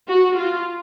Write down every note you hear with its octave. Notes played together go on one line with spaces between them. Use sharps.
F#4
F4